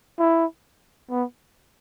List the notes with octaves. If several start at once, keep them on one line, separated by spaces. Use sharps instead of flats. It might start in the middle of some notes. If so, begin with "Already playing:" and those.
E4
B3